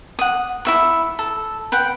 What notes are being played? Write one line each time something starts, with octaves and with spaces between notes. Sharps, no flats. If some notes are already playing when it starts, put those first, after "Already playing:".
F#5 D#6
E4 E5 C#6
A4
B4 F#5 G5